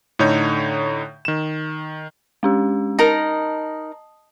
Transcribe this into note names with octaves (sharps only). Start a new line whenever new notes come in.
A2 D3 D#4 C#5 G6
D#3 E7
G#3 C#4 G4
D#4 A#4 D#5 A5 D#6